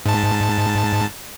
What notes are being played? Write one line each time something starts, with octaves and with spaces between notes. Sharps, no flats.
G#2 A5